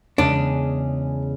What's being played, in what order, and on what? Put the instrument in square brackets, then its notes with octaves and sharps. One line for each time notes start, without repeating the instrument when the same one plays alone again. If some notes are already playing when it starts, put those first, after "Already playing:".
[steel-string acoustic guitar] E2 C#3 G#3 C#4 G#4 [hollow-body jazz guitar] D4